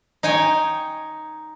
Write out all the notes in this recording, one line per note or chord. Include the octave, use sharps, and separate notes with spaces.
D#4 C#5 G5 G#5